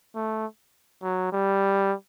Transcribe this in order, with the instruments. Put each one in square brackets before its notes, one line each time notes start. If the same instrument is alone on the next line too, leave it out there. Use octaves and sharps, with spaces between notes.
[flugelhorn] A3
F#3
G3